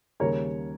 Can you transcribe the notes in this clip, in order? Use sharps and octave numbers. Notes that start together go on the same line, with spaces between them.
D#2 C#3 G3 A#3 A#4 C#5